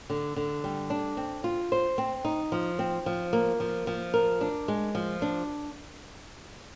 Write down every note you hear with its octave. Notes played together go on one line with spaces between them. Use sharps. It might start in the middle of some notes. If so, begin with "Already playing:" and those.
D3
D3
G3
D4
C4
F4
C5
C4
D#4
F3
C4
F3
A#3
F3
F3
A#4
D4
G#3
F3
D4